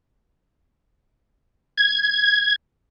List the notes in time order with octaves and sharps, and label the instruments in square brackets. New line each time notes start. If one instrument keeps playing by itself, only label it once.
[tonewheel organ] G#6